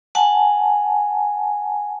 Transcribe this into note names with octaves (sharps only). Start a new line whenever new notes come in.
F#5 G#5 A5